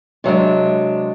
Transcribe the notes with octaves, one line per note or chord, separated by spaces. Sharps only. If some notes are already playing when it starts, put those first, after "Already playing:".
C3 F#3 G#3 D4